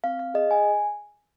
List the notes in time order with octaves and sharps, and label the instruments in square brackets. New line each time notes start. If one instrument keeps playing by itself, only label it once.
[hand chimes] C4 F5
F5
G#4 D#5
G#5